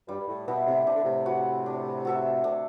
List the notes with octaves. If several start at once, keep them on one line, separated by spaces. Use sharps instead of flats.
G2 G3
G2
A2
B2 B3 E4
A2 C3
C3 D4
D3
A2 C3
F#4 B4
D4
F#4 A4 E5
A2 C3 D4